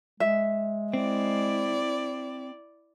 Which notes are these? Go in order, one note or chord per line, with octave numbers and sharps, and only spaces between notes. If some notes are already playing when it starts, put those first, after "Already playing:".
G#3 E5
C4 E4 D5